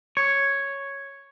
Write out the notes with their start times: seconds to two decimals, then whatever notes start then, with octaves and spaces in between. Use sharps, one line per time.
0.17 C#5